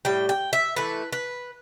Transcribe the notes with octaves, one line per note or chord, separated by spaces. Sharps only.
A2 G3 G5
G5
E5
E3 A3 E4 B4
B4